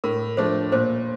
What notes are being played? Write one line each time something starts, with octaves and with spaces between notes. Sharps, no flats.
A2 A#4
F3 A3 D4 C5
A#2 C5